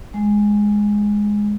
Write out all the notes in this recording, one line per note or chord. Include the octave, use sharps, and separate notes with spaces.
G#3